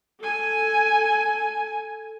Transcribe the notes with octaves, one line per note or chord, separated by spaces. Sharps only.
A4 G#5